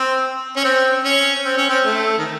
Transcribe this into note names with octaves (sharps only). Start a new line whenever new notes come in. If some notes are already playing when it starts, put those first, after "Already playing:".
Already playing: C4
C#4
C4
C#4
C4
C#4
C4
A3
D#3